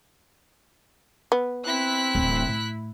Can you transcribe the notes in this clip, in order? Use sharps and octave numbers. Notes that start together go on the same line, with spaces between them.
B3
C4 E4 F#6 B6
D1 E3
A2